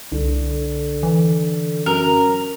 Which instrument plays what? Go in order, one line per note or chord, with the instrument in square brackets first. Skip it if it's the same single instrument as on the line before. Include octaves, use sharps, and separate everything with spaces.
[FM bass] C2 [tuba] D3
[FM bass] E3
[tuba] F#2 [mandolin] A#4